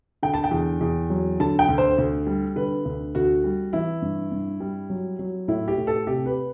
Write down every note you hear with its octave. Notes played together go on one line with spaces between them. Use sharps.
D3 G5
A5
G5
E2
E2
F#3
D3 A5
G5
D2
C5
D2
G3
D3 B4
D2
D2 F#4
G3
E3 E4
G2
G2
G3
F#3
F#3
A2 E4
G4
A2
A4
C3 G4
B4